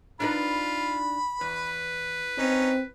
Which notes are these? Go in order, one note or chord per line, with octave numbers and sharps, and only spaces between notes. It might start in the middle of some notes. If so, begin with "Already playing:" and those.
D4 D#4 F4 B4 B5
E2 B4
C4 C#4 D#4 D#5